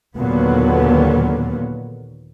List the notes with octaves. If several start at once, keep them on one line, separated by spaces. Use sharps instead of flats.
D#2 A#2 D3 F#3 A#3 B3